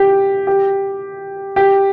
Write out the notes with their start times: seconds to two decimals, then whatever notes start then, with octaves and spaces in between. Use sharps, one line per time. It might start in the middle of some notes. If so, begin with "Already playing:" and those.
Already playing: G4
0.47 G4
1.56 G4